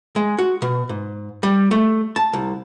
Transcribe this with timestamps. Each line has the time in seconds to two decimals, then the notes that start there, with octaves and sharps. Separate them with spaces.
0.16 G#3
0.39 F#4
0.62 B2
0.89 G#2
1.43 G3
1.71 A3
2.16 A5
2.33 C2